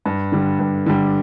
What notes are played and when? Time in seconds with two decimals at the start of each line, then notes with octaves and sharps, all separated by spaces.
0.06 G2
0.32 D3 G3
0.59 G2
0.86 D3 G3